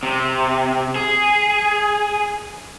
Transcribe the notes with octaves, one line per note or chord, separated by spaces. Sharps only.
C3
G#4